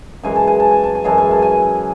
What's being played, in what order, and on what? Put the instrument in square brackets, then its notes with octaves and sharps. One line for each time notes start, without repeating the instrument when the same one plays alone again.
[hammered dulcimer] F#2 E3 G#3 G#5
A5
G#5
A5
G#5
A5
G#5
F#2 E3 G#3 A5
G#5
A5
G#5